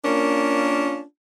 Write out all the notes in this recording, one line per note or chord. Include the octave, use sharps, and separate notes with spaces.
A#3 C#4 D4 F4 A#4